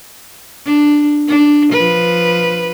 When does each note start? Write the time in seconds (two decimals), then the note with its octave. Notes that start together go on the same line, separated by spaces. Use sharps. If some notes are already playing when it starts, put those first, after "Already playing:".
0.66 D4
1.28 D4
1.72 F3 B4